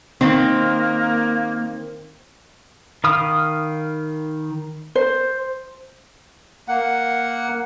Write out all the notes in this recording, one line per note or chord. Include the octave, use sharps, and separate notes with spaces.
D#3 A#3 C4
D#3 F5 B5 D#6 F6
C5
A#3 F#5